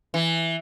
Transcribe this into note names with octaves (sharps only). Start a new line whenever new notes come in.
E3